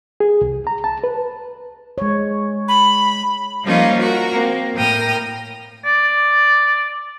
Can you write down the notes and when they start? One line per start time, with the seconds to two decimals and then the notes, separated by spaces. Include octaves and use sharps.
0.20 G#4
0.41 C2
0.67 A#5
0.84 A5
1.04 B4
1.98 G#3 C#5
2.68 B5
3.64 F3 G3 A#3 C#4 D#4 F4
3.98 F#4 A#4
4.31 A#3 C4
4.75 A2 A#4 G5 D#6 F6
5.85 D5